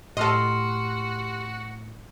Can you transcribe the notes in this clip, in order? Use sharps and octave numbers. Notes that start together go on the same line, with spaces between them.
A2 F#4 G4 A4 D#5 C6 F6